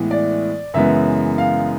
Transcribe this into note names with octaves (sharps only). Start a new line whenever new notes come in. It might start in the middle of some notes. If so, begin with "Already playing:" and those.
Already playing: A2 E3 G#3 B3
D5
F#2 C#3 E3 G#3 B3 E5
F5